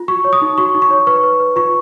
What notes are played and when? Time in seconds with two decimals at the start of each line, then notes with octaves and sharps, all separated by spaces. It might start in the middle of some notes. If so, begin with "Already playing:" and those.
Already playing: F4
0.08 F#4 C#6
0.24 C#5
0.33 D#6
0.42 D#4
0.58 F#4 C#6
0.75 D#4
0.82 C#6
0.90 C#5
1.07 B4 C#6
1.23 B4
1.40 B4
1.56 F4 C#6